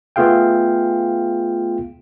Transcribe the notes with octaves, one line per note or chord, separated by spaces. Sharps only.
A3 B3 F4 G#4 F5 G5